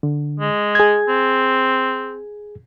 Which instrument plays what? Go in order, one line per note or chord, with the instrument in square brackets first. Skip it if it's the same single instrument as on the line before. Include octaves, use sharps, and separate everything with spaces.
[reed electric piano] D3
[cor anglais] G#3
[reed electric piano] G#4 G#6
[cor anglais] C4